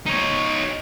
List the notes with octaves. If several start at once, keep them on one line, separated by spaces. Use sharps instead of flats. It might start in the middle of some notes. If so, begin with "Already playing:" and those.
D#4 C#5